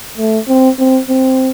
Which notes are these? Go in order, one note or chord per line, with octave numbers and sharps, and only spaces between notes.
A3
C4
C4
C4